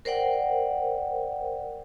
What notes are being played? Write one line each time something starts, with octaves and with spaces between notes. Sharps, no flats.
A#4 C5 D5 F#5 G5